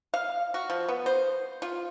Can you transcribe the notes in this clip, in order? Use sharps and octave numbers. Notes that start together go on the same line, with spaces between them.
F5
F#4
F3
B3
C5
F4